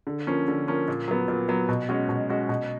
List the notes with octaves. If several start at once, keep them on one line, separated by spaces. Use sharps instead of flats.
D3
F3 A#3 C#4
D3
F3 A#3 C#4
A#2
F#3 B3
A#2
F#3 B3
B2
G#3 C#4 F#4
B2
G#3 C#4 F#4
B2